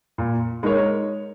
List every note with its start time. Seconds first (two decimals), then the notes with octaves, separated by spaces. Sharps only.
0.18 A#2
0.63 G#3 D#4 A#4 C#5